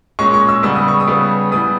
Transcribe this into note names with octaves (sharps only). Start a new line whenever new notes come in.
A#2 G#3 C#4 C#6
C#6
E6
C#3 G3 B3 E6
D#6
C#6
D#6
C#3 G3 B3
E3 G3 B3 D#6